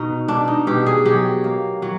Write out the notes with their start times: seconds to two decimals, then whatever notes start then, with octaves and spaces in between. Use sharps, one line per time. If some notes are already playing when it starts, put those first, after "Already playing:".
Already playing: B2 D#4
0.28 B2 D4
0.48 D#4
0.67 B2 G4
0.86 G#4
1.05 F#3 G4
1.44 A#3
1.82 F#3